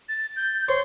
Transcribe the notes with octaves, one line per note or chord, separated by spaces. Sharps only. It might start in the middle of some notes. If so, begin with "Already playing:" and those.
A6
G6
C5 C#5 C6